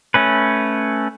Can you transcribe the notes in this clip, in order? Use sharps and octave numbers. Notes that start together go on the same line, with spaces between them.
A3 C#4 B4